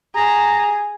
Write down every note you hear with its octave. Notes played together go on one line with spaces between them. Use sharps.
G#4 A#5